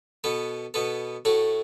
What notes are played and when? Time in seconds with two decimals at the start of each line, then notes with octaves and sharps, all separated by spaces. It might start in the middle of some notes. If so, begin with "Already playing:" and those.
0.24 B2 B3 A4
0.74 B2 B3 A4
1.25 A2 A3 F#4 A4